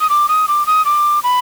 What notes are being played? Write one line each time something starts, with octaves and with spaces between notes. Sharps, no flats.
D#6
D6
D#6
D6
D#6
D6
B5